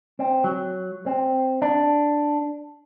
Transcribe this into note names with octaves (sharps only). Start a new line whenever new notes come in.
C4
F#3
C4
D4